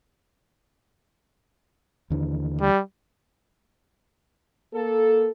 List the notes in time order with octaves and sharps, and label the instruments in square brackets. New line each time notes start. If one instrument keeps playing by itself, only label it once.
[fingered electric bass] D#2 D3 E3
[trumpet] G3
[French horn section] A#3 A4